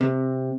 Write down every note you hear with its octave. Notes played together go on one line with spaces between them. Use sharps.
C3